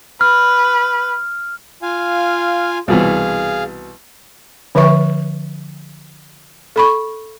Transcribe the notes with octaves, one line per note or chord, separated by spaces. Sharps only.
B4 F6
F4 F5 G#5
C2 B2 E3 G#4 F5
D3 F3 B4 E5 C#6
A4 B5 C#6